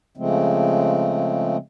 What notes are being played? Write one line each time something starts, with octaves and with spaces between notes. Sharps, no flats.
C#3 F3 G#3 A3 C4